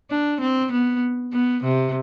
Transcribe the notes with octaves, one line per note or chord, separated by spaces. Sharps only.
D4
C4
B3
B3
C3